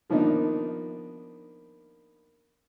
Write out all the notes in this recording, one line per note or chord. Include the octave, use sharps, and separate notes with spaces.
D#3 F3 A#3 B3 D4 D#4